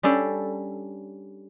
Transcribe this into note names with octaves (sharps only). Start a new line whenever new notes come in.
G3 C#4 D4 A4